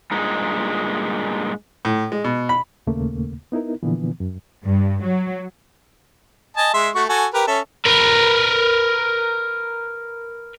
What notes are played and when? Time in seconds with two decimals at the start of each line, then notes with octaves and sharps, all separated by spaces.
0.11 G2 A#2 G#3 D#4
1.85 A2
2.12 G#3
2.24 B2
2.49 B5
2.87 D#2 A#2 C#3 A3 A#3
3.52 B3 D#4 E4 A#4
3.83 A#2 D3 E3 F3 B3
4.20 F#2
4.64 G2
5.05 F#3
6.57 D#5 G#5 A5
6.74 G#3 E5 C6
6.95 A3 F#4 C#6
7.09 F#4 A4 G#5
7.34 G4 A#4 B4
7.47 C#4 A4 E5
7.85 A#4 B4